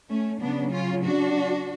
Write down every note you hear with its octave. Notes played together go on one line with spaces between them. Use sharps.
A3 C#4
C#3 F#3 B3 D4
C#4 F4
D4 F#4